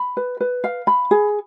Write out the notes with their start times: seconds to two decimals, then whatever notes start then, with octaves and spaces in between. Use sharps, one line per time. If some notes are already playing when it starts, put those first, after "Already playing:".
Already playing: B5
0.17 B4
0.40 B4
0.64 F5
0.87 B5
1.11 G#4